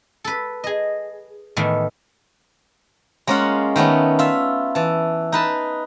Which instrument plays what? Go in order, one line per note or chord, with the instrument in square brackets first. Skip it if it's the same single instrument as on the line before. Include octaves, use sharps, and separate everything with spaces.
[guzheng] A4 B4
G#4 D#5
A2 D#3 E3 B3
G#3 A#3 C#4 F4 F#5
D#3 A3 B3 C#4
F4 E5
E3 A5
D#4 B4 A5